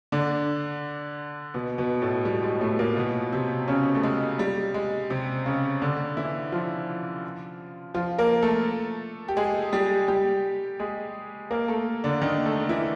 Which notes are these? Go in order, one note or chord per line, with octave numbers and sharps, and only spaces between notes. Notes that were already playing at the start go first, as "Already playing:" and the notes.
D3 D4
B2 B3
B2 B3
A2 A3
G3
G#3
A2 A3
A#2 A#3
B2 B3
C3 C4
C#3 C#4
A3
G#3
G3
G#3
C3 C4
C#3 C#4
D3 D4
E3 E4
F3 F4
F3 F4
A#3 A#4
A3 A4
G4
G#3 G#4
G3 G4
G3 G4
G#3 G#4
A#3 A#4
A3 A4
D3 D4
D#3 D#4
A3 A4
E3 E4